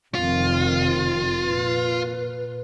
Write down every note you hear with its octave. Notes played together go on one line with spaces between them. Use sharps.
F1 C3 D#3 C4 F4
A#2 B4